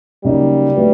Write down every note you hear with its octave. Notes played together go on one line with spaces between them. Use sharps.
C#3 F#3 G3 A#3 D#4
F#3 A3 D4 F#4 B4